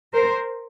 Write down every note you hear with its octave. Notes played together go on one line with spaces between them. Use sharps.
A#4 C5